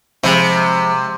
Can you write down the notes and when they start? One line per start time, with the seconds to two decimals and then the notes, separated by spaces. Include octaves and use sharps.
0.23 C3 F3 G#3 E4